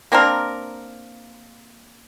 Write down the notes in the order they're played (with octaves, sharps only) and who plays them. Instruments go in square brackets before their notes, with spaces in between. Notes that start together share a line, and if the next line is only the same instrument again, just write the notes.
[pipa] A#3 C4 D4 A#4